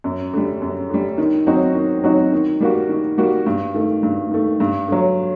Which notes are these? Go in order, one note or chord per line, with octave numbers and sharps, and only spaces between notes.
F#2
D3 G3
F#2
D3 G3
D#3
F#3 C4 D#4 F#4
D#3
F#3 C4 D#4 F#4
D#3
G3 A#3 F#4
D#3
G3 A#3 F#4
G2
D#3 A3
G2
D#3 A3
G2
D3 F#3